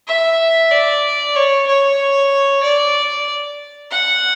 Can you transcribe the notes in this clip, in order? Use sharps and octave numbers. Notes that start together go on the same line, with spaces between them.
E5
D5
C#5
C#5
D5
F#5